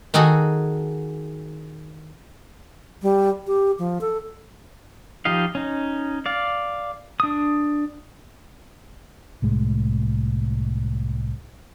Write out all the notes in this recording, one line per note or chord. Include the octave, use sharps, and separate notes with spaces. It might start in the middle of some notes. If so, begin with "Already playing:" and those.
D#3 D#4 F#4 G#4 A4
G3
G4
F3
A4
F3 D#4 G4 D#5 F5
C#4 D#4
D5 F5
D4 D#6
C2 A2 G#3